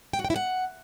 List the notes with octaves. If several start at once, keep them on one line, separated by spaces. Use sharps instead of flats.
G5
F#4
G5
E4
F#5